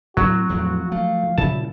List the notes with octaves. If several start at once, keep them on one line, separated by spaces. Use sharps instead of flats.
A2 F#3 C4 F#4
E2 A2 F3 C4
A3 F5
A#2 C#3 G3 E4 A5